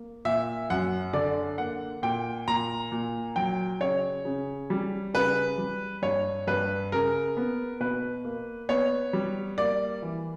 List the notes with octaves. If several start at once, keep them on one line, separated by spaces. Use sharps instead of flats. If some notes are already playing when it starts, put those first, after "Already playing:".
Already playing: A#3
A#2 E5
F#2 F#5
D3 D5
A#3 F#5
A#2 G5
A#2 A#5
A#2
F#3 G5
C#3 C#5
C#3
G3
C#3 B4
G3
G2 C#5
G2 B4
C#3 A#4
B3
B2 B4
A#3
B3 C#5
G3
A#3 D5
E3